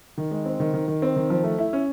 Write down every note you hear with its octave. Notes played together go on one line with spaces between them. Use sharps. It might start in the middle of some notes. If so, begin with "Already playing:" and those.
D#3
G#3
C4
D#3
D#3
D#3
C4
D#3
F3
A3
E4
C#4